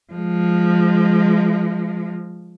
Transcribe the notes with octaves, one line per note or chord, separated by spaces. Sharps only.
F3 G#3